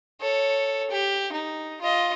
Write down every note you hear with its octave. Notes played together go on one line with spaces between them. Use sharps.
A4 C#5
G4
D#4
F4 D#5